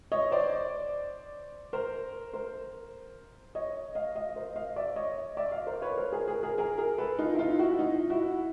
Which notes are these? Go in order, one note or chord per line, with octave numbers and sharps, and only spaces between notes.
C#5 D#5
C5 D5
A#4 C5
A#4 C5
C#5 D#5
D#5 F5
D#5 F5
A#4 C5
D#5 F5
D5 E5
C#5 D#5
D5 E5
D#5 F5
A#4 C5
B4 C#5
A#4 C5
G#4 A#4
G#4 A#4
G#4 A#4
G#4 A#4
G#4 A#4
A4 B4
D#4 F4
E4
D#4 F4
E4 F#4
D#4 F4
E4 F#4